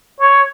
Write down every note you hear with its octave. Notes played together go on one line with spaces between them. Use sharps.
C#5